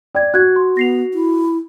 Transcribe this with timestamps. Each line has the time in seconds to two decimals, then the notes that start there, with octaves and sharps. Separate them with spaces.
0.15 D5 G5 G#6
0.34 F#4 F#6 G#6
0.56 C6
0.77 B3 A#6 C7 F7
1.14 E4